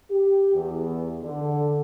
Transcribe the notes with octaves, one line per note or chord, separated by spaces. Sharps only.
G4
E2
D3